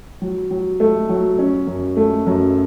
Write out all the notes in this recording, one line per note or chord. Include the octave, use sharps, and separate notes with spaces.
F#3
F#3
A3
F#3
C#4
F#2
A3
F#2